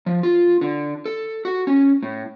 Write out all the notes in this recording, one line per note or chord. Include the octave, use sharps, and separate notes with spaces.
F3
F4
D3
A4
F#4
C#4
A2